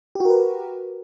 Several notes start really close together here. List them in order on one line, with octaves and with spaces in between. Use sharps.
G4 F#4 A#4 B4